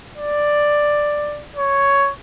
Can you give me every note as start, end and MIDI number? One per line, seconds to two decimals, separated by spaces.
0.14 1.44 74
1.55 2.11 73